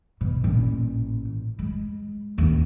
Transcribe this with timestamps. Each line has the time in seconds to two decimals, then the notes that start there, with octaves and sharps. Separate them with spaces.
0.21 B2
0.44 A1 A#2
1.59 G#3
2.38 A1 D#2